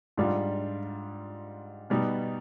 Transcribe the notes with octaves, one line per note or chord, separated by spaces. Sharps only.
G#2 G3 D4 F4
B2 G3 B3 D#4